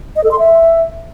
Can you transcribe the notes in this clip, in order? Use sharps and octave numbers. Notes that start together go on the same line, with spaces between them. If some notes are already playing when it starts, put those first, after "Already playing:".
D#5
A4
C6
E5